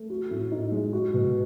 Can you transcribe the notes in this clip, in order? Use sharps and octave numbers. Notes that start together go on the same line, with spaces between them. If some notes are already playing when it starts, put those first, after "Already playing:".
Already playing: A3
F#4
A2
D#4
G#3
F#4
B2